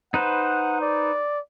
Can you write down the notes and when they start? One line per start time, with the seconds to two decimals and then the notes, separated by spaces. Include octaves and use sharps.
0.14 D#4 B4 C5 F#5
0.81 D5